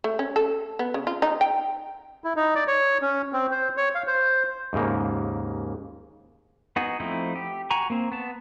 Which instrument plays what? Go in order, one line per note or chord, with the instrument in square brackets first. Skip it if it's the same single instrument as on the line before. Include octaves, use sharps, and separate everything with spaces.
[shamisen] A3
C#4
A4
B3
C#3
F4
D#4
G5
[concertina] E4
D#4
D5
C#5
C#4
C4
C5
C#5
F5
C5
[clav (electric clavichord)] D#2 G#2 C#3 A#3
[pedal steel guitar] B3 D#4 F#4 G#4
F3 A3 C4 D#4 E4
G4
F#4 G#5 A#5 C#6
A#3 C4
B3 A5